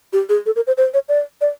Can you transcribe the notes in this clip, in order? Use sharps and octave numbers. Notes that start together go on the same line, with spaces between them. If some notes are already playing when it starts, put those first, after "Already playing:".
G4
G#4
A4
A#4
C5
C5
C#5
D5
D5